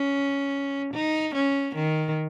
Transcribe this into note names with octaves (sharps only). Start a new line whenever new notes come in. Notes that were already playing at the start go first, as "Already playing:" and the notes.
Already playing: C#4
D#4
C#4
D#3